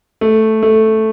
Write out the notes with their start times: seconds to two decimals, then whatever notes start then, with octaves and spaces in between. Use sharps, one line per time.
0.21 A3
0.63 A3